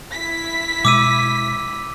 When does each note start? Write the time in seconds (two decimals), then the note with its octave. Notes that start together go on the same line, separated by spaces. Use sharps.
0.13 E4 B6
0.85 B2 G#3 D6 E6 D#7